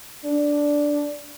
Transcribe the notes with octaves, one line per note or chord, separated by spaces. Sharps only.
D4